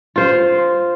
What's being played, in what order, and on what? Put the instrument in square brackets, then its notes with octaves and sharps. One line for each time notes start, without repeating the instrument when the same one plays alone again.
[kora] F4 C5